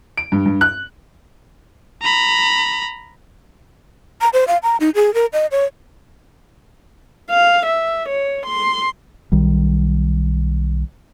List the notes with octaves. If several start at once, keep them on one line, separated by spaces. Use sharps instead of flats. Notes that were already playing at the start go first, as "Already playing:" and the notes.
D7
G2
G2
F#6
A#5 B5
A#5
C5
F5
A#5
D#4
G#4
A#4
D#5
C#5
F5
E5
C#5
C6
B1 D#3 G3